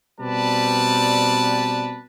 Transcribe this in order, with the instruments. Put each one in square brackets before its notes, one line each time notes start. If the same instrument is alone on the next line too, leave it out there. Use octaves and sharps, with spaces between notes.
[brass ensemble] B2 G3 C4 B4 D5 A5